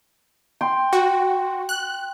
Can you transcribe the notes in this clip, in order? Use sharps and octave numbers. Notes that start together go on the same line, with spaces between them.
G5 C6
F#4
F#6